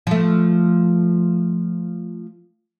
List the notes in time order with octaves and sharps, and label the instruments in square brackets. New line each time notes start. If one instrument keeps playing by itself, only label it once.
[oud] F3 A3